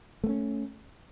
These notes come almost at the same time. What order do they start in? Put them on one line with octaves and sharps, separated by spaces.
A3 B3 C#4